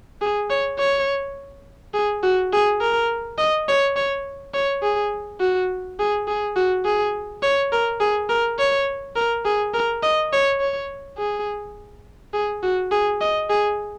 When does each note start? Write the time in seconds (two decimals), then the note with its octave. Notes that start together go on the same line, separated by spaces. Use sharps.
0.21 G#4
0.50 C#5
0.79 C#5
1.94 G#4
2.23 F#4
2.53 G#4
2.81 A#4
3.38 D#5
3.68 C#5
3.96 C#5
4.54 C#5
4.83 G#4
5.40 F#4
5.99 G#4
6.27 G#4
6.56 F#4
6.85 G#4
7.43 C#5
7.72 A#4
8.01 G#4
8.29 A#4
8.59 C#5
9.16 A#4
9.45 G#4
9.74 A#4
10.03 D#5
10.32 C#5
10.60 C#5
11.18 G#4
12.34 G#4
12.63 F#4
12.92 G#4
13.21 D#5
13.50 G#4